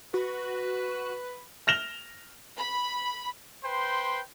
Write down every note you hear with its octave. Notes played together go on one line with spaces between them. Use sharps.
F#4 B4
F6 A#6 E7 F7 G7
B5
B4 C5 G5 C6